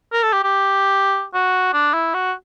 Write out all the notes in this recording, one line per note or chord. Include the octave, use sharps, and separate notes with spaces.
A#4
A4
G4
G4
F#4
D4
E4
F#4